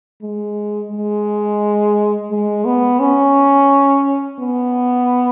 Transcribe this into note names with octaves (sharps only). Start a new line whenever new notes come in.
G#3
G#3
G#3
B3
C#4
B3